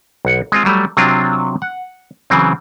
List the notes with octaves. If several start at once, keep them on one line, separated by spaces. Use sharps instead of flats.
B1 F#5
G#3 C4 F4
F#3 G3 A3
C3 F#3 C4 D4 F4
F#5
C#3 E3 F#3 C4